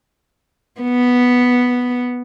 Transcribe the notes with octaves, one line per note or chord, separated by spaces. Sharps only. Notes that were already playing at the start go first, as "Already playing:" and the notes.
B3